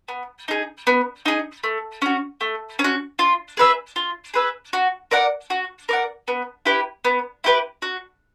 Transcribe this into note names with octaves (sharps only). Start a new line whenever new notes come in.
B3
D#4 G#4
B3
D#4 G#4
A3
C#4 F#4
A3
C#4
F#4
F4
G#4 B4 E5
F4
G#4 B4 E5
F#4
A#4 D5 F#5
F#4
A#4 D5 F#5
B3
E4 G4 B4
B3
E4 G4 B4
F#4